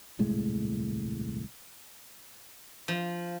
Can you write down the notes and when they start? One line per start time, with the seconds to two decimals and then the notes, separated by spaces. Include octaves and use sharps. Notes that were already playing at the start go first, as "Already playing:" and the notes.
0.19 D#1 C2 A2 G#3
2.88 F3